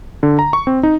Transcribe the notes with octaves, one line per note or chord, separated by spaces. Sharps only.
D3
A#5
C#6
C4
D#4